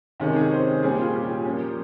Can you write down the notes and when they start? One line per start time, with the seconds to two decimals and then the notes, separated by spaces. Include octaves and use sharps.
0.20 C3 D#3 G#3 C#4
0.36 G#4
0.51 C5
0.82 A#2 G3 C#4 G#4
0.99 F4
1.14 G4
1.45 F3 A#3 C#4